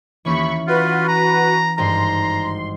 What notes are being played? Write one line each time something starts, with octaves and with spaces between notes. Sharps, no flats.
D#2 E3 C#4 B5 C#6
F4 F#4 B4
A#5
G#1 G2 A#5 C6